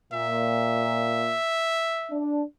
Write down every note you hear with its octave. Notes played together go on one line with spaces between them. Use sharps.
A#2 E5
D4